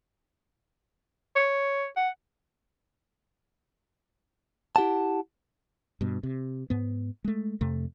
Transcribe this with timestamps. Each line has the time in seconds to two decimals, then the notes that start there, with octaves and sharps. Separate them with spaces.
1.36 C#5
1.96 F#5
4.76 E4 G4 F#5 A5
6.01 G2 B2
6.23 C3
6.70 G#2 B3
7.24 G#3 A3
7.61 F2 C3 A3